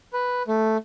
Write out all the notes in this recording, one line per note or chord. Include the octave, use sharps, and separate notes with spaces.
B4
A3